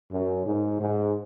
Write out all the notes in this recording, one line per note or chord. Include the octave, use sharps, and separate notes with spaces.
F#2
G#2
G#2